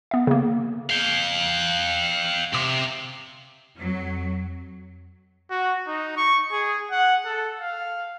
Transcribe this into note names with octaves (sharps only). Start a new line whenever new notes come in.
B3 E5
C#3 A#3
F5 G5
C3 C6 D6
F2 F#3
F#4
D#4
C#6
G#4
F#5
A4
F5